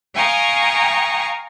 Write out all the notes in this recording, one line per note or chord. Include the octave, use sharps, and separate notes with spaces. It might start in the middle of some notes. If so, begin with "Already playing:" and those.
F5 G5 G#5 A#5 C#6 D#6